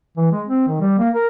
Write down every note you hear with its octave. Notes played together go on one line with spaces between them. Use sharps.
E3
G#3
C4
D#3
G3
A#3
A#4